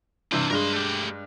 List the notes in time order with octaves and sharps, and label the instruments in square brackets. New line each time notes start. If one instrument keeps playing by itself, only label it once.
[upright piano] G2 C3 E3 [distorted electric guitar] D4 C5
[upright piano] G2 G#3 [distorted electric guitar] A#4 C6
[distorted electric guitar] A3 G4